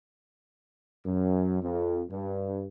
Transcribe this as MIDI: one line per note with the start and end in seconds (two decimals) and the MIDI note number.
1.05 1.59 42
1.62 2.03 41
2.10 2.66 43